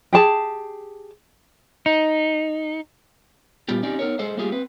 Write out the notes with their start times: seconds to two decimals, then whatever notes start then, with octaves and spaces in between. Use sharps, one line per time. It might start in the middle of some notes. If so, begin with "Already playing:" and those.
0.13 G4 G#4 A5
1.86 D#4
3.69 A#2 G3 B3 F4 G4
3.83 C4 C#4 D#4 G4 D5
3.99 B3 D#4 A#4 C#5
4.19 G#3 G#4 A4 C5 D#5
4.37 G3 A3 A#3 F4 G4 G#4
4.52 C4 B4